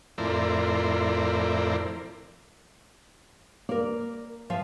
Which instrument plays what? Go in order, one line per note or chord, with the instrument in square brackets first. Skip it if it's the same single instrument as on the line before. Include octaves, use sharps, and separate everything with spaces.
[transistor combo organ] F2 A2 E4 A#4 C5 D5
[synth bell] A#3 [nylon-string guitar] A#4 D5
[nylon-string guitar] F3 E5 F5